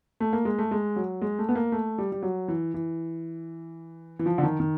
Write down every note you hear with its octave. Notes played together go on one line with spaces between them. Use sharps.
A3
A#3
G#3
A3
G#3
F#3
G#3
A3
B3
A#3
A3
G3
G3
F#3
E3
E3
E3
F3
D3
D#3
D#3